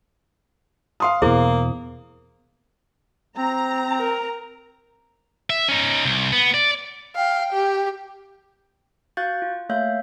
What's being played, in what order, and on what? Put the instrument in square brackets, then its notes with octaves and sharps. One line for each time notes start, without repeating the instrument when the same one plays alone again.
[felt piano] F5 C6 D#6
[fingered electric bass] E2 B2 [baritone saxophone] A#3 [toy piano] E4 G#4 C5
[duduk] C4 [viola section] A#5
[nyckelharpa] A#4
[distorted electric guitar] E5
C#4 D#4
C2
B3
D5
[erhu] F5 [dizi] G5
[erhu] G4
[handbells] F#4 F5 C#6 F#6 G6 A6
F4
A3 A#3 C#5 E5 F5 G6